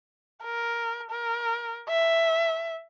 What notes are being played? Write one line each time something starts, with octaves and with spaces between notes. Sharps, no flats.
A#4
A#4
E5